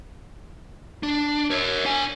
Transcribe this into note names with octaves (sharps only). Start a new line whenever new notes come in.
D4
A#4 C#5
D4 G#5